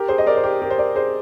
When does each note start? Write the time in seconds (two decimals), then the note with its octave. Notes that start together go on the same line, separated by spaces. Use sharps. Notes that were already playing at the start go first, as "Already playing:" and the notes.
Already playing: G4 A#4
0.08 G#4 C5
0.18 D#5
0.27 A#4 D5
0.36 C5
0.43 G4 A#4
0.62 G4 A#4
0.70 C5
0.78 A#4 D5
0.96 G#4 C5